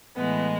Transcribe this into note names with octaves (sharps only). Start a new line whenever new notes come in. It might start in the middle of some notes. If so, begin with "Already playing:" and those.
A2 E3 G#3 B3